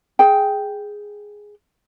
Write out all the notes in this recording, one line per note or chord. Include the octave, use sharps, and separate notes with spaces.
G#4 G5